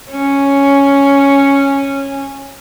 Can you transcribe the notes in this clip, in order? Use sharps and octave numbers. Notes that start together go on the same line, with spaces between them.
C#4